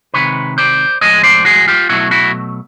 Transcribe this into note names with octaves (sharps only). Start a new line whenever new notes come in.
C3 D#3 G#3 B4 C#5
C5 D5
A2 F3 G#3 C#5 D#5
C5 D5
F#4 G#4
F4 G4
B2 F#3 A3 E4 F#4
E4 F#4